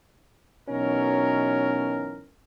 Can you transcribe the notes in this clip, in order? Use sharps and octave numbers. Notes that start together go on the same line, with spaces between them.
B2 E3 F#3 C#4 D#4 A#4